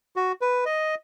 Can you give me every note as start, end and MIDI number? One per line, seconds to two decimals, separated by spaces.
0.16 0.32 66
0.41 0.64 71
0.66 0.95 75